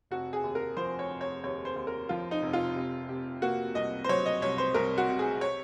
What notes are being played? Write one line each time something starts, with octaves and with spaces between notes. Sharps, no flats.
F1 F#4
G#4
D#2
A#4
F3 C5
C#5
F1
C#5
D#2 C#5
C5
D#2
A#4
F3 F4
D#4
F1
F4
C3
C3
A#3 F#4
C2 D#5
C5
F#3 C#5
D#5
C2 C#5
C5
C2 A#4
F#4
C3
G#4
C#5